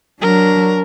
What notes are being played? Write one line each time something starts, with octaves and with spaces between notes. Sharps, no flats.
F#3 D4 A#4